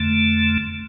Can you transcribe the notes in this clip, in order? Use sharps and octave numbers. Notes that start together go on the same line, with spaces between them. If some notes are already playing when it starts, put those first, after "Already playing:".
Already playing: F2 D3 A3